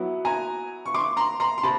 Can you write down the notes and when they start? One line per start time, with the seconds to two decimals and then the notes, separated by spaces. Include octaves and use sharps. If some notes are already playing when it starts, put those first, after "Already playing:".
Already playing: F#3 B3 E4
0.25 G#5 A#5
0.86 C#6
0.94 C6 D6
1.17 A#5 C6
1.40 A#5 C6
1.58 C6
1.63 C3 A5 B5